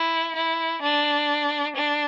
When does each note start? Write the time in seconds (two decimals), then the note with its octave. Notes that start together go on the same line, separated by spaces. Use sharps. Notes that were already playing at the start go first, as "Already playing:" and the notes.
Already playing: E4
0.36 E4
0.82 D4
1.76 D4